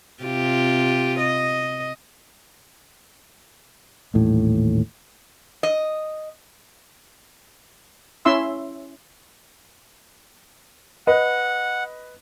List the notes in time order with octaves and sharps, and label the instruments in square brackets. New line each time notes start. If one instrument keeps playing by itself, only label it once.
[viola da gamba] C3 F4 G4
D#5
[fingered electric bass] D#1 A1 D#2 A2
[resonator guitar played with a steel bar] D#5
[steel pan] C#4 E4 E5 C6 E6
[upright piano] B4 D#5 [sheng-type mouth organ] F#5